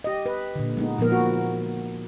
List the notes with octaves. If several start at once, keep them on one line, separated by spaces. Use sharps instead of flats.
G4 D#5
B4
A#2 D3
G#3 B3 D#4
A#2 F3 B3 A#4
F#4